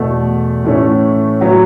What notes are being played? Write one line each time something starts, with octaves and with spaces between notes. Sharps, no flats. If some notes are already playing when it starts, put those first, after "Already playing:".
Already playing: E2 B2 A3
A2 E3 A3 C#4
A2 F#3 B3 F#4